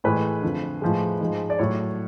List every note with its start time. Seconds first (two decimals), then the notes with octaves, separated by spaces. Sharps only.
0.04 A2 E3 G#3 B4
0.42 F2 D3 F3
0.81 A2 F3 G#3
1.20 G#2 F3 G#3
1.50 D5
1.58 A2 F#3 C#5